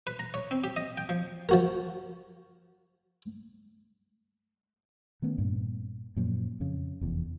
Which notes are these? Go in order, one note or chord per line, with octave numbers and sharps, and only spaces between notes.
B4
A#5
C#5
C4
G4
D#5
G5
F3
F3 F#4 A#4
D#3 A3 B3 C#4
G2 A#2
F#2 A#2 F3
F2 C#3
F1 E2